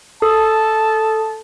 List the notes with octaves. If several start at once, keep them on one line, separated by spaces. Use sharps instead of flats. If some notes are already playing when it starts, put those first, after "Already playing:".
A4 A5 D#6